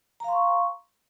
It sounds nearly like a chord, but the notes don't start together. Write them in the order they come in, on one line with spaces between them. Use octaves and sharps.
A#5 F5 C6 C#6